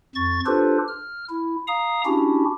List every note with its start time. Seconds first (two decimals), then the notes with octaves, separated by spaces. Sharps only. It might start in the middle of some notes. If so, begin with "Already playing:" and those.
0.15 F2 C#6 A6
0.46 D4 F4 G4 A4 B4 C5
0.88 F6
1.29 E4
1.67 F5 A#5 D#6
2.05 C#4 D4 E4 F#4 G4